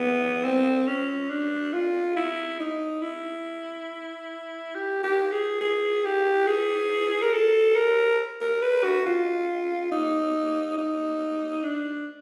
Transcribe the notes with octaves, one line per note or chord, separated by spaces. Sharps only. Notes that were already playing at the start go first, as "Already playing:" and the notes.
Already playing: B3
C4
C#4
D4
F4
E4
D#4
E4
G4
G4
G#4
G#4
G4
G#4
A#4
A4
A#4
A#4
B4
F#4
F4
D#4
D#4
D4